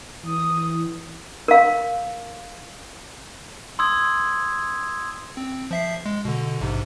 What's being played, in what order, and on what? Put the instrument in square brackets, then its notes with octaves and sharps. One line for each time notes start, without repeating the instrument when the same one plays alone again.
[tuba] E3 [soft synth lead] D#6
[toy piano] A#4 F5
[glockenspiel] C6 D#6 E6 G#6
[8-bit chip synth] C4
F3 E5 C7
G#3
B2 D3
A#1 G#2 C3